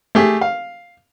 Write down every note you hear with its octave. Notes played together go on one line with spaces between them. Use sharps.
A3 G4 G#4
F5